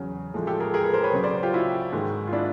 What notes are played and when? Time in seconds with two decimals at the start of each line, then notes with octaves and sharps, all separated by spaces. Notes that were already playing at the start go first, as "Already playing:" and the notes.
Already playing: E2 C#3 F#3
0.34 A2 F3 G#3
0.47 G4 A4
0.60 G#4 A#4
0.74 G#4 A#4
0.84 A4 B4
0.93 A#4 C5
1.03 B4 C#5
1.13 C#2 C#3 F#3
1.24 C5 D5
1.43 F4 G4
1.53 E4 F#4
1.92 G#2 D#3 G#3
2.28 F4
2.32 D4 E4